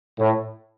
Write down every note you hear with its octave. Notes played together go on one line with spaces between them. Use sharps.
A2